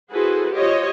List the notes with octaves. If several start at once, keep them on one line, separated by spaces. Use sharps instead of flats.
E4 F#4 G#4 A4 B4 C5
F4 G4 C5 C#5 D#5